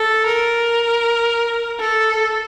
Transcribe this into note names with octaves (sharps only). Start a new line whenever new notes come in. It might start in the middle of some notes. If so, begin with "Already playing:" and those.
Already playing: A4
A#4
A4